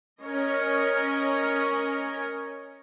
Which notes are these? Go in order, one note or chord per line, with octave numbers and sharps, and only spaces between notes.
C#4 A#4 C#5 D#5